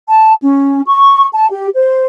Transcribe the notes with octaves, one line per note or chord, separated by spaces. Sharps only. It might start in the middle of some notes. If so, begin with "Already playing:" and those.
A5
C#4
C#6
A5
G4
C5